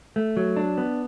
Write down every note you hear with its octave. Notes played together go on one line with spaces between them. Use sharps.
A3
F#3
D4
B3